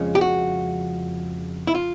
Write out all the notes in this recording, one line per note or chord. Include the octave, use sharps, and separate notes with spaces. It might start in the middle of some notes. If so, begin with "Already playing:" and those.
Already playing: F2 C#3 F3 G#3 C#4
G4
F#4
E4
F4